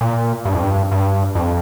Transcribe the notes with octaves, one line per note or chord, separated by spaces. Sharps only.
A#2
G2
F2
G2
G2
F2